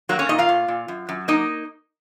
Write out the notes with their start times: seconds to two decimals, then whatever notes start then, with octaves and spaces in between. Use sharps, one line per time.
0.09 F#3 A#3 F#4
0.19 C#4 C#5
0.29 A#2 D#4 D#5
0.39 F4 F5
0.49 A#2
0.68 A#2
0.88 F#2
1.09 F#2
1.28 A#3 D#4 D#5